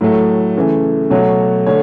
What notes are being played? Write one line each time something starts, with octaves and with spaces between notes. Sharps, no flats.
A2 F#3 A3
C#3 E3 A3
B2 F#3 A3 C#5
D3 A3 C#5